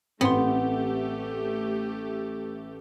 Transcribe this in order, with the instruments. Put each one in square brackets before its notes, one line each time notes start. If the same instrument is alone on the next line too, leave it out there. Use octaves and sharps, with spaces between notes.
[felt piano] A1 B4 [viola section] A3 G4 [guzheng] B3 [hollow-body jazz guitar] C4 C6